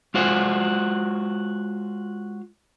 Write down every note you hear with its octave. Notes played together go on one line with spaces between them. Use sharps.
G#3 F4 F#4 C5 G#5